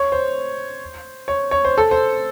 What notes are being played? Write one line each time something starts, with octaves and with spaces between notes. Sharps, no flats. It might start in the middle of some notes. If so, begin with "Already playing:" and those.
Already playing: C#5
C5
C#5
C#5
C5
A4
C5